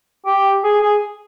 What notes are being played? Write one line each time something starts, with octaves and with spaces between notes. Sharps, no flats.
G4
G#4
G#4